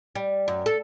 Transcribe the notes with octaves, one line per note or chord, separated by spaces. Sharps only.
G3
F#2
A4